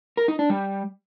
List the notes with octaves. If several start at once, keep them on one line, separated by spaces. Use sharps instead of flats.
A#4
D#4
D4
G3